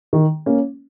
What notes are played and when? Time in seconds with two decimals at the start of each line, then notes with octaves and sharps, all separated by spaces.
0.13 D#3
0.46 A#3 C#4